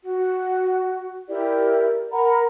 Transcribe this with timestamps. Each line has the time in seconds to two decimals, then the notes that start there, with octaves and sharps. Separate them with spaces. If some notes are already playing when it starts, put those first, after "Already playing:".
0.04 F#4
1.28 E4 G4 A#4 D5
2.12 A#4 F#5 A#5 B5